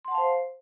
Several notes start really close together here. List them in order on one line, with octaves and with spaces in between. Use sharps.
C6 F#5 A5 F5 C5